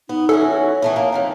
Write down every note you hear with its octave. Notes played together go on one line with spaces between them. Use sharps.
B3 D#4
E3 C#4 F#4 A4
C#5
E3 A3 B3
A#3
F2 D#3 E3